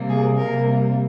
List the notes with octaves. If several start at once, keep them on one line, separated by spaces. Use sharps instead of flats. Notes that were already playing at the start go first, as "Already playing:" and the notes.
Already playing: C3 G3 A#3
G#4
C3 G3 A#3 A#4